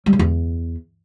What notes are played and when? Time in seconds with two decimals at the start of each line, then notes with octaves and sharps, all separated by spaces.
0.06 G3
0.13 C#3
0.19 E2